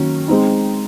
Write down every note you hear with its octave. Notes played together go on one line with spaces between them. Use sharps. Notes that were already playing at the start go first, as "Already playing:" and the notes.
Already playing: D#3 F#3 A#3 C#4
G#3 C4 D#4